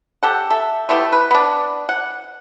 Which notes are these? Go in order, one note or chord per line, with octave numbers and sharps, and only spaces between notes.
G4 A4 F#5
A4 E5
A3 B3 E4 G4
B4
B3 D4
F#5